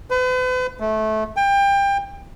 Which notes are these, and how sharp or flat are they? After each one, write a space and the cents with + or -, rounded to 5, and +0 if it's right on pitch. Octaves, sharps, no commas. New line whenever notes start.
B4 +40
A3 -20
G5 +25